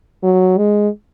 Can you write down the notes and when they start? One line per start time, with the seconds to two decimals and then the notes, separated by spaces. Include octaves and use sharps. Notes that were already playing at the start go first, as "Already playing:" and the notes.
0.23 F#3
0.57 G#3